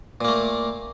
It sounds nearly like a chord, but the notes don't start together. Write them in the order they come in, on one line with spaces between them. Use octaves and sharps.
A#2 A#3 A3